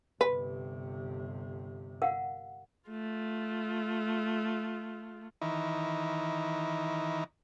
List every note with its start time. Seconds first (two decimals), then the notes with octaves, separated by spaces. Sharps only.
0.21 G1 C3 B4
2.02 A#4 F5 F#5
2.89 A3 F4
5.41 D#3 E3